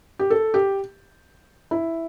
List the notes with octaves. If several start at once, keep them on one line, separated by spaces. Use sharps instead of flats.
G4
A4
G4
E4